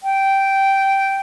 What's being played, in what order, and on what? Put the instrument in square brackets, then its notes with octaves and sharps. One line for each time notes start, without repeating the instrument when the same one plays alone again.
[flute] G5